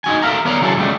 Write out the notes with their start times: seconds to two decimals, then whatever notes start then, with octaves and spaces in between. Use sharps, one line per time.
0.04 D#4 F#4 G#5
0.22 A4 A#4 D5 E5 F5 A#5
0.45 B3 A#4 C#5 D5 A#5
0.61 C#3 F#3 E4 G#4 A4
0.77 C#2 C#3 G3 A3